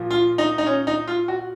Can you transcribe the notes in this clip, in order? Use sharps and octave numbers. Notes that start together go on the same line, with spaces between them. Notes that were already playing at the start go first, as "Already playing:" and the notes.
Already playing: A#2 F3
F4
D#4
D#4
C#4
D#4
F4
F#4